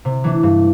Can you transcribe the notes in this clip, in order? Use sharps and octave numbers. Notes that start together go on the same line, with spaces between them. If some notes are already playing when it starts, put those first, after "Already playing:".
C3
E3 A3 D4
G2